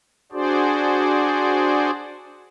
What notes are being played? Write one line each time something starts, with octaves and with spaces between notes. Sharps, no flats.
D4 F#4 G#4 C5 D5